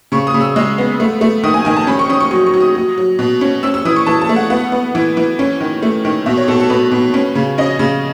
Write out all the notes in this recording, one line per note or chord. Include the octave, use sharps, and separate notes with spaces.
C#3 C#6
D#6
C#3
E6
G#3 E6
B3
A3
A3
D#3 D#6
G#5
D#3 G#5
A5
C#4 B5
C#6
C#4 D#6
C#6
F#3 C#6
C#6
F#3
D#6
F#3
F#3
B2
C#4
C#4 E6
E6
E3 D#6
C#6
E3 A5
A5
A3
F#5
B3 F#5
B3
E3
E3
C#4
D#3
A3
D#3
B2 E5
C#5
B2 A4
A4
B2 B4
B2
C#4
C#3
C#4 D#5
C#3